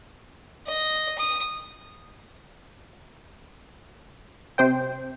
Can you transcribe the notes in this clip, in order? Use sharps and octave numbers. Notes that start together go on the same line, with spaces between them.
D#5
D#6
C3 C5 G5